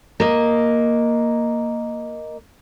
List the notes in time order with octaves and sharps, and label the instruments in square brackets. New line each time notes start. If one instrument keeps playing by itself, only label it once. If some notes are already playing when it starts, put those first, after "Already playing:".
[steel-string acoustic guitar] A#3 D#5